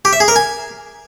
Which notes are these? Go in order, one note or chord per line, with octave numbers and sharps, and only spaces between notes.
G4
E5
G#4
A#4
G#5